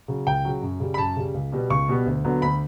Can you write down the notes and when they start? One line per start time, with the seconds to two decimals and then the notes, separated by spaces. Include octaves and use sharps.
0.08 C#3 F#3
0.27 C#2 G5
0.45 C#3 F#3
0.62 F#2
0.80 C#3 G3
0.94 B5
0.98 F#2 A5
1.17 C#3 G3
1.34 C#2
1.52 B2 G3 B3
1.70 C#2 C#6
1.88 B2 G3 B3
2.06 D2
2.24 D3 F#3 B3
2.42 D2 B5